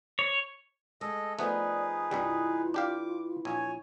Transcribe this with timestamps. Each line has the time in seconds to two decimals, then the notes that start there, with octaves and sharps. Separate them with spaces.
0.19 C#5
1.01 G#3 A4 D#5
1.39 F3 A3 B3 D#4 G#4 B4 D5
2.11 C2 G2 E3 G3 F4
2.74 D4 G4 F5 D6
3.45 A#1 C#5 G#5